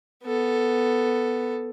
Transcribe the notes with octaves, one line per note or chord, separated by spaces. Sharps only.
B3 A4